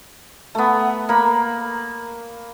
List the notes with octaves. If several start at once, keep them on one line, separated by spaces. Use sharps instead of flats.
A3 B3
A#3 B5